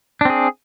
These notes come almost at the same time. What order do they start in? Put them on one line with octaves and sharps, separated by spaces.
D4 C4 G#4